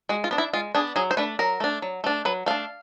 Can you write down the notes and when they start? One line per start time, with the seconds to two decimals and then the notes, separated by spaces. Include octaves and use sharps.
0.09 G#3 F#4
0.24 F4
0.31 B3 D4
0.38 E4
0.53 G#3 F4
0.75 B3 D4 G#4
0.96 F#3 G#4
1.11 C5
1.17 A3 D4 B4
1.39 F#3 A#4
1.60 A3 D4
1.82 F#3
2.04 A3 D4
2.25 F#3 B4
2.46 A3 D4 F5